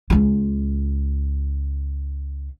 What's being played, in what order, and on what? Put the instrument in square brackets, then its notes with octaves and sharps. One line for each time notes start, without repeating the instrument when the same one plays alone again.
[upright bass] C#2 F4